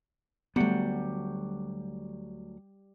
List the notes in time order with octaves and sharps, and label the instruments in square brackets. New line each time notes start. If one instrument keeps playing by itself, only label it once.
[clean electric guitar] D2 F#3 F#5 [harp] G3 G4 [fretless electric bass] A3 B3